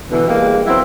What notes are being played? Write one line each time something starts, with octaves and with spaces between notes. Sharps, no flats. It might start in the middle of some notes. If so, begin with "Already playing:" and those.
B2 D3 E3
E2 G3 G#3 A#3
F#3 B3 C4 E4